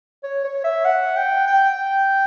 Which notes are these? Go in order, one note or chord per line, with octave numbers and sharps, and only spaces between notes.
C#5
C#5
E5
F#5
G5
G5